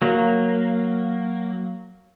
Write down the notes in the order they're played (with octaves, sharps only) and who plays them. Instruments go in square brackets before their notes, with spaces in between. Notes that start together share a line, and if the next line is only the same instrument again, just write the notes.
[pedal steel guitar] F#3 A#3